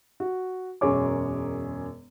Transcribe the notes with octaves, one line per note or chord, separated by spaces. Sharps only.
F#4
E1 F#2 G#4 C#5 D6